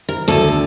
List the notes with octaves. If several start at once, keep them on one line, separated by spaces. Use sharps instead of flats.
A#4
D2 D3 A4